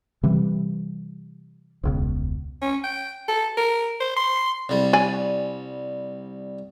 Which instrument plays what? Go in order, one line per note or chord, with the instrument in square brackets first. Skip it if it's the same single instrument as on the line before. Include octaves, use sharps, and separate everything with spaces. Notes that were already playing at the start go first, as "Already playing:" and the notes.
[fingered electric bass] C3 E3 G3
E1 C#2 B2
[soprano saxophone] C#4
G5
A4
A#4
C5
C6
[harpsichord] C2 G3
[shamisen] D5 G#5